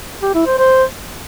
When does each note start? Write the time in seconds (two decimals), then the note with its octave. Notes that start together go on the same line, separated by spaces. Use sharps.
0.23 G4
0.34 E4
0.46 C5
0.58 C5